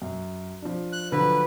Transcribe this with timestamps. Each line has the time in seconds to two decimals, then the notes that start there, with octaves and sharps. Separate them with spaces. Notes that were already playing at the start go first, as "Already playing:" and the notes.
0.02 F#2
0.62 F3 D4
0.93 F#6
1.12 D3 F3 F#3 B4